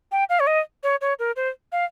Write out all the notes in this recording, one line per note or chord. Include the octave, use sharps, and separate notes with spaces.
G5
F5
C#5
D#5
C#5
C#5
A#4
C5
F5